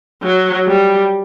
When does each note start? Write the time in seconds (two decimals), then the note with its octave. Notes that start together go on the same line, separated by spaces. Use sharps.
0.23 F#3
0.67 G3